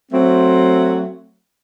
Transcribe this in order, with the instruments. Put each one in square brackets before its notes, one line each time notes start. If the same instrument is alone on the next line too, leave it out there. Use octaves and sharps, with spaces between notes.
[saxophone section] F#3 A3 C4